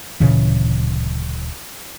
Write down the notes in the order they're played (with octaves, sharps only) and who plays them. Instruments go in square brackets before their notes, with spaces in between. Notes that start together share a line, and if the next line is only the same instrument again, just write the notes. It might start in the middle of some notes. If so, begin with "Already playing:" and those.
[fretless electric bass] D1 A#2 C#3 E3